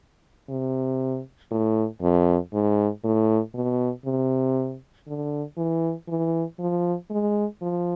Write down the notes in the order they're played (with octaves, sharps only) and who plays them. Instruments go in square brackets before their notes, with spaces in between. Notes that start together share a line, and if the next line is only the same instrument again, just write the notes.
[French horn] C3
A2
F2
G#2
A2
B2
C3
D3
E3
E3
F3
G#3
F3